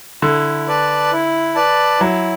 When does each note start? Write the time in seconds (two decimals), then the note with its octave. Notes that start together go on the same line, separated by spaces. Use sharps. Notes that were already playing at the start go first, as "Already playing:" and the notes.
0.22 D3 E4
0.67 B4 D5 A5
1.12 E4
1.55 B4 D5 A5
2.00 F#3 E4